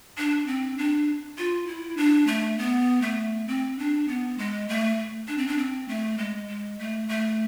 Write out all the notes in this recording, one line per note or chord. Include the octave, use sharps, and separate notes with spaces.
D4
C4
D4
F4
E4
D4
A3
B3
A3
C4
D4
B3
G#3
A3
D4
C4
D4
C4
A3
G#3
G#3
A3
A3